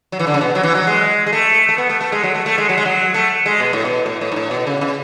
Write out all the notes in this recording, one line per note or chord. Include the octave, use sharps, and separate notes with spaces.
F#3
E3
D3
C#3
B2
F#3
E3
F#3
G#3
G#3
A3
A3
B3
A3
A3
G#3
F#3
A3
A3
G#3
F#3
G#3
F#3
A3
G#3
B2
A2
B2
A2
A2
G#2
A2
B2
C#3
C#3